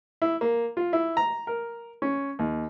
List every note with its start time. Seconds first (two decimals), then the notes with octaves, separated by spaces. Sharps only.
0.22 E4
0.41 A#3
0.77 F4
0.93 E4
1.17 A#5
1.47 A#4
2.02 C#4
2.39 D#2